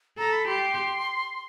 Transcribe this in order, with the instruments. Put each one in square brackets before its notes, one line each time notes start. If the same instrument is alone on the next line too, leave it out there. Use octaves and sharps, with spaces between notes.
[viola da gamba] A4 [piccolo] A#5
[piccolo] B5
[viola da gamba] G4 [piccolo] C6